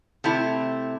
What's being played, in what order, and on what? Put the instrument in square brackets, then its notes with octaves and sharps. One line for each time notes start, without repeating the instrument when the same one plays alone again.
[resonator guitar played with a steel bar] C3 A3 E4